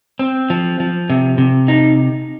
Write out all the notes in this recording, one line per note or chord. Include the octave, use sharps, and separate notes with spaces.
C4
F3
F3
C3
C3
D#4